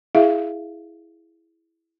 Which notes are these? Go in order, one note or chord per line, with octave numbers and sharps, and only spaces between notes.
E4 G#4 E5 F5